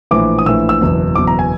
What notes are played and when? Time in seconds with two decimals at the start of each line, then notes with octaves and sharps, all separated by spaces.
0.11 A#1 A2 E3 D6
0.39 D#6
0.46 A#1 A2 E3 E6
0.69 E6
0.81 F#1 E2 B2
1.16 F#1 E2 B2 D6
1.27 A#5
1.39 G#5